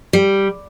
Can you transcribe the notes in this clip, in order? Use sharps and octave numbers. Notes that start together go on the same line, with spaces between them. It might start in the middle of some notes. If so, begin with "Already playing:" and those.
G3